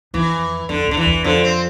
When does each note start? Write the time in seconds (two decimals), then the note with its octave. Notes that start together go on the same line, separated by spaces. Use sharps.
0.14 F2 E3
0.69 F2 D3
0.87 F2 D3
0.97 E3
1.06 E2
1.24 F2 D3
1.44 C4